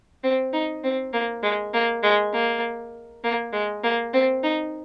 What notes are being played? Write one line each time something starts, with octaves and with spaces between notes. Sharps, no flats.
C4
D#4
C4
A#3
G#3
A#3
G#3
A#3
A#3
G#3
A#3
C4
D#4